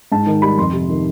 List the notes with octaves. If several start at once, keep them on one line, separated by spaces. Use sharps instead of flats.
G#2 A5
D#3
G3 B5
F2 C6
C3
D#3